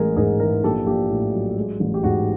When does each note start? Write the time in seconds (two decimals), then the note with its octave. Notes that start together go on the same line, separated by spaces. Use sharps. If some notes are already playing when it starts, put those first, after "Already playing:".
Already playing: A1 G#3 G#4 A#4
0.16 G#2 G#4 A#4
0.40 E3 G#4 A#4
0.63 A#1 G4 A4
0.86 A#1 G4
1.11 A2
1.33 F#3
1.57 G#3
1.80 A1
1.94 G4
2.03 G#2 F#4